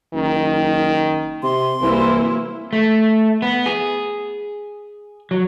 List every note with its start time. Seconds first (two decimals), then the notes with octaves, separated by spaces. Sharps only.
0.14 F#1 D#3
1.43 C3 C6
1.82 C2 E3 F#3 A#3 E4
2.73 A3
3.42 B3
3.66 G#4
5.31 F#3